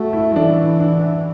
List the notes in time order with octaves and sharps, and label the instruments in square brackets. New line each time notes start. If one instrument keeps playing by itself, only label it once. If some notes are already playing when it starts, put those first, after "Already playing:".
Already playing: [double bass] A3 [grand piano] F#4 A4
[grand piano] E4
[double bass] E3 [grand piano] D4
[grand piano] D4